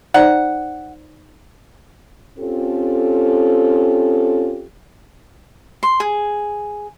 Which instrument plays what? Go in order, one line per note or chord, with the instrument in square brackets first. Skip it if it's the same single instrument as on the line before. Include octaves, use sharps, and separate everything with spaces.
[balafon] D#4 C5 D5 [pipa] F#5
[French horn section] C4 C#4 F4 G4 A4
[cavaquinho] C6
G#4